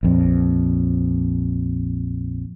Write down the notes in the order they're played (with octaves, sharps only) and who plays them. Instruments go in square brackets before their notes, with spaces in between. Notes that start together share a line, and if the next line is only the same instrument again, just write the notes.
[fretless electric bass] A#1 F2